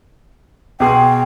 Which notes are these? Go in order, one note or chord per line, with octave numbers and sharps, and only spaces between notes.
B2 G#4 G5 C6